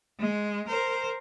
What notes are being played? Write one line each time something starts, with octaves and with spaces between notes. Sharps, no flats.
G#3
A#4 C5